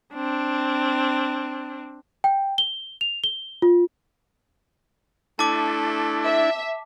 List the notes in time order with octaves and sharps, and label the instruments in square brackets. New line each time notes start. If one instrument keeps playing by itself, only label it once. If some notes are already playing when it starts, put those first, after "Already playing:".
[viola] C4 D4
[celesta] G5
G7
F7
G7
F4
[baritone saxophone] A3 [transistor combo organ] D4 E4 [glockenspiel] A5 D6
[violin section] E5